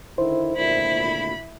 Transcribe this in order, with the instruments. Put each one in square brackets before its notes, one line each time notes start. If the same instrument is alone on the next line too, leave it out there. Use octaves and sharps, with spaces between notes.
[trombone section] D3 D#3 E4 [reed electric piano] C5
[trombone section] G#1 D2 A#2 [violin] E4 [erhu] B5